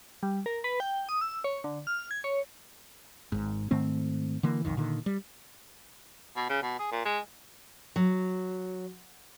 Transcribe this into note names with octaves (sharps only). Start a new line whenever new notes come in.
G3
A#4
B4
G5
D#6
E6
C#5
D3
F6
G#6
C#5
G#1 G#2
G#2 D#3 A3 C4
D3 E3 A#3
B1 F2 D#3
A#2 D3 D#3
G3
B2
C#3
B2
G#4
A#2
G#3
F#3